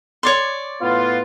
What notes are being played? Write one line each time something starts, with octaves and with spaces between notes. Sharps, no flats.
C#5 D5 C6
A2 B3 F4